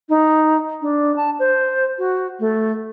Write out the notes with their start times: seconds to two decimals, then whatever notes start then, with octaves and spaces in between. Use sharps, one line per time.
0.09 D#4
0.82 D4
1.16 A5
1.39 C5
1.98 F#4
2.40 A3